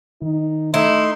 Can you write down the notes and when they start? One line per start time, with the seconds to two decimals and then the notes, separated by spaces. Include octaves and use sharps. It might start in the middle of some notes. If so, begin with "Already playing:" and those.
0.22 D#3 D#4
0.74 A3 D#4 E4 C6